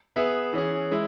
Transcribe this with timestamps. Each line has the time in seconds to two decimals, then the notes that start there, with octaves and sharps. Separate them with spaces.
0.16 B3 G#4 B4 E5
0.53 E3 C#4 G#4
0.91 G#3 E4